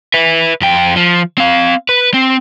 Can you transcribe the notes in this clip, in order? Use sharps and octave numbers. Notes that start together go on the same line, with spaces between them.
B4 E5
F2 G5
F3
C4 F5
B4
C4